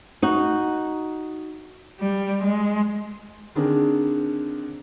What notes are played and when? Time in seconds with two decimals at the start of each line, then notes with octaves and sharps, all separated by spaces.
0.22 D#4 F#4
2.00 G3
2.44 G#3
3.55 D3 D#3 C4 D4 G#4 A#4